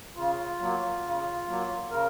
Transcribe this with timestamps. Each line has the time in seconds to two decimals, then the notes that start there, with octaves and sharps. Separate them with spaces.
0.15 C#3 F4
0.60 F#3 A#3
1.03 C#3
1.47 F#3 A#3
1.91 C#3 A#4